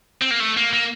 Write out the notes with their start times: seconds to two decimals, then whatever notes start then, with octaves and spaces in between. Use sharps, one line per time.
0.22 C4
0.31 A#3
0.40 A3
0.57 A#3
0.73 A#3